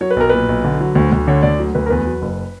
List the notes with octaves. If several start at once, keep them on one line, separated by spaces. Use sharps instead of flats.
F#3 C#5
B4
B1 A#4
A#2 B4
B1
D3
F#3
D2
D2
D3 C#5
D2 D5
F#3
D2 B4
A#4
E2 B4
F#3
F#1